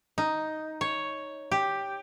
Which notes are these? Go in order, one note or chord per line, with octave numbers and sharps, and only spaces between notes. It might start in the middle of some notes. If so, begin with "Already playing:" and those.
D#4
C#5
G4